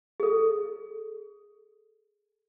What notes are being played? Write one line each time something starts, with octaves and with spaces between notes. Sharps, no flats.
G#4 A4